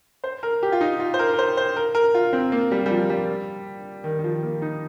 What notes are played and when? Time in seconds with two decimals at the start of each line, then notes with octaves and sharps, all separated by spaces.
0.24 C5
0.43 A#4
0.63 G4
0.72 F4
0.81 D#4
1.00 F4
1.14 C5
1.19 A#4
1.33 A#4
1.39 C5
1.57 C5
1.76 A#4
1.95 A#4
2.14 F4
2.33 C4
2.52 A#3
2.71 G3
2.86 G3
2.91 F3
3.09 G3
4.04 D#3
4.19 D#3
4.24 F3
4.43 A#3
4.62 D#4